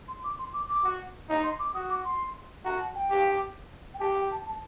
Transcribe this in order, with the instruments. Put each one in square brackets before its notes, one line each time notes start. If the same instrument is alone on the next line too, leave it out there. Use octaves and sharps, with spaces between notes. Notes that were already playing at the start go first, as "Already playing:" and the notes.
[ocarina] C6
D6
C6
D6
D6
[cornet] F#4
D#4
[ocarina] C6
D6
[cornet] F#4 [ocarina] D#6
[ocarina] D6
C6
[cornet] F#4 [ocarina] A#5
[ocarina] A5
G5
[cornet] G4
[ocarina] G5
[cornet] G4 [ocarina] A5
[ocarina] G5
A5
A5